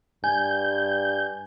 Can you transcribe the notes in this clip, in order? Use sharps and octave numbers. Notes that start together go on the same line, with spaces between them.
G2 G#5 G6